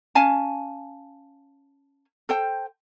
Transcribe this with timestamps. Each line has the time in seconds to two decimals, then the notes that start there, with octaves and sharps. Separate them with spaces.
0.15 C#4 F5 G#5 A5
2.29 A4 C5 G5